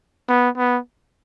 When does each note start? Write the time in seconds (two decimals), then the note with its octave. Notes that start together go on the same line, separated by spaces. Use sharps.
0.29 B3
0.57 B3